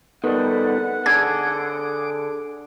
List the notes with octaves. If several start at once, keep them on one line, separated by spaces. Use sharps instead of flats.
D#3 G3 B3 A4 B4 F#5
D3 G#4 A4 D6 G#6